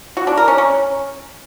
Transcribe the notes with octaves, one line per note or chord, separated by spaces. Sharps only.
F#4
D4
A#4
C#4
C#4